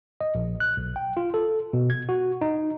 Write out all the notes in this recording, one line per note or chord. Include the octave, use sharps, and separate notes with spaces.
D#5
A#1
F#6
B1
G5
F4
A4
B2
G#6
F#4
D#4